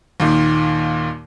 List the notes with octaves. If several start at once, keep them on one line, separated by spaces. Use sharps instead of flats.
D#2 A#2 D#3